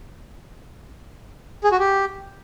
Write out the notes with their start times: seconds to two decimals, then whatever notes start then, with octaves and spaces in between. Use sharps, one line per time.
1.64 G#4
1.72 F#4
1.80 G4